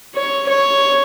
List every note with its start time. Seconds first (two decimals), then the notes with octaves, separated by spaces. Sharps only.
0.15 C#5
0.49 C#5